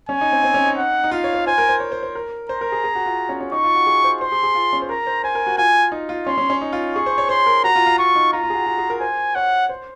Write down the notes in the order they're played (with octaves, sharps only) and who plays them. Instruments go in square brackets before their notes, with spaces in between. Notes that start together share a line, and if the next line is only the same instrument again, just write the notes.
[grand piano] C#4 [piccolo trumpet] G#5
[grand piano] D#4
C4
C4
C#4
D#4
[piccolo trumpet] F#5
[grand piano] D#4
[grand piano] F4 [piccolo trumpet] F5
[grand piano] C#5
C#5
[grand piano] C5 [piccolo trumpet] G#5
[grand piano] A#4
C5
C#5
C5
C5
A#4
[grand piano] C5 [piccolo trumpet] A#5
[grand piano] A#4
G#4
G#4
F#4
F4
C#4
C#4
[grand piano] D#4 [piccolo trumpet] C#6
[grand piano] F4
F#4
G#4
C5
[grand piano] C5 [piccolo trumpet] C6
[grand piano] G#4
G#4
F4
C#4
C5
[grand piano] A#4 [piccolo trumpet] A#5
[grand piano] C5
[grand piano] C5 [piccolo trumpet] G#5
[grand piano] A#4
F#4
[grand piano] F4 [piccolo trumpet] G#5
[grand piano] D#4
F4
[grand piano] C#4 [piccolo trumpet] C6
[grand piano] C#4
C#4
D#4
F4
[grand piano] G#4 [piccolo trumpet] C#6
[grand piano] C5
C#5
[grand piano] C5 [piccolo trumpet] C6
[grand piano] A#4
[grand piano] F#4 [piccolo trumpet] A#5
[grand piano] F4
F4
[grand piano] F4 [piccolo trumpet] C#6
[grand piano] D#4
[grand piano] F4 [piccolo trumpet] A#5
[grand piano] F4
G#4
F#4
F#4
G#4
A#4
[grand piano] C5 [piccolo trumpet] G#5
[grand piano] C#5 [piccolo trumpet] F#5
[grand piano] C5